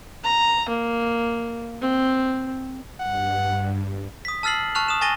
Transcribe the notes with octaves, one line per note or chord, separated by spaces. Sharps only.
A#5
A#3
C4
G2 F#5
D#6 B6
A5 E6 F6 A6 C7 F#7
A5 C#6 F6 F#6 F7
D#6 E7
G#5 C#6 A6 A#6 D#7 G7